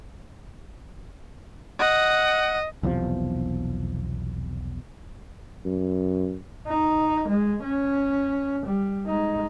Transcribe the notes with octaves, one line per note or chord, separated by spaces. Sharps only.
D#5 F#5
B1 E2 C3 F3
F#2
D#4
G#3
C#4
G3
G#3 D#4